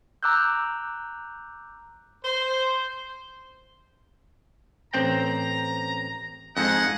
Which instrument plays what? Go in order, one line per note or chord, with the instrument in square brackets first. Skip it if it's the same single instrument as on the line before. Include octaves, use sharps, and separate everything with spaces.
[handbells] A#5 D6 E6 F#6 G6
[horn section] C5
[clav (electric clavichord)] A1 C4 G5 [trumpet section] A#5
[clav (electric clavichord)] F2 G#2 [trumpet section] G#4 D#5 F#5